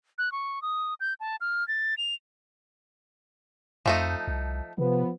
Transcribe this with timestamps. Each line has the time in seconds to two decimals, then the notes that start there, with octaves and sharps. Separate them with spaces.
0.18 F#6
0.32 C#6
0.62 D#6
1.00 G6
1.20 A5
1.41 F6
1.68 A6
1.98 F7
3.86 F2 F3 A3 D#4
4.28 C2
4.78 C3 F3 B3